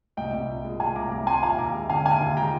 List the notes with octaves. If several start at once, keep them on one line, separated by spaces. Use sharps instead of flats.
C2 D#5 G5
C2
A#2
G#3
C2 F5 G#5
C2 A#5 D6
C2 A#5 D6
A#2 G#5 C6
D#2 F5 G#5
D#2 A#5 D6
G#3
D3 F5 G#5
D#2 F5 G#5
D#2
G#3 G5 A#5